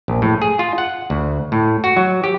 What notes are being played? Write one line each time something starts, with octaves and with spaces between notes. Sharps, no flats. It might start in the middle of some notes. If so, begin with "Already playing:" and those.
A#1
A2
G#4
F4
F#5
D2
A2
F#4
F#3
G4